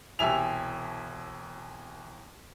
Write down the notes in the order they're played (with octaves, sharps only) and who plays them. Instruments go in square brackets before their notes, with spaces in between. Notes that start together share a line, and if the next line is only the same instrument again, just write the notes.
[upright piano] E1 C2 G4 E5 G#5 F7